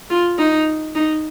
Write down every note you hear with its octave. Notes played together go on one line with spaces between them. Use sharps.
F4
D#4
D#4